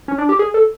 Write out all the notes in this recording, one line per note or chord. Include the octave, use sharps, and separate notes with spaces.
C#4
D4
G4
G#4
A4